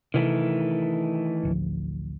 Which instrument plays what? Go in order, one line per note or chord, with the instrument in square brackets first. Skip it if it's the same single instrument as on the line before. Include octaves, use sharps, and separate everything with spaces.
[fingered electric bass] C3 [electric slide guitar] D#3 E3 A3
[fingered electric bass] A1 D2 F3